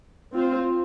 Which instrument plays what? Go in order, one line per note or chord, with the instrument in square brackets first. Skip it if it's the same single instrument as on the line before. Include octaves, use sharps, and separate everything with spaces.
[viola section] C4 F4 C5